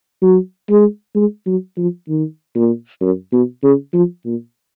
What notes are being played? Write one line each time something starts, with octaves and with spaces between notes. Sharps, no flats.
F#3
G#3
G#3
F#3
F3
D#3
A#2
F#2
B2
C#3
F3
A#2